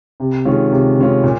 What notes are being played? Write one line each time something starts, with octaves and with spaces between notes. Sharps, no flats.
C3
D#3 G#3 C#4 F4
C3
D#3 G#3 C#4 F4
A#2